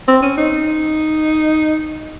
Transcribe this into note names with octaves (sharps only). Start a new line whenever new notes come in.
C4
C#4
D#4